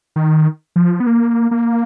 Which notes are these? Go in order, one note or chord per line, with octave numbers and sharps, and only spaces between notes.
D#3
F3
B3
A#3
A#3